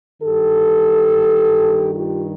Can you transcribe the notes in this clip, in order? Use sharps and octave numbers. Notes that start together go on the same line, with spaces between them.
G2 D#3 G4 A4
F4 G4